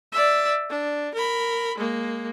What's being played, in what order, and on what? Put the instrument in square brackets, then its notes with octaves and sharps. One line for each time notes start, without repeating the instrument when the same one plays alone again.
[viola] D5 E5
D4
A#4 B5
G#3 A#3